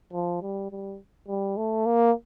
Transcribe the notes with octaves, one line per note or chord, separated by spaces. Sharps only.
F3
G3
G3
G3
A3
A#3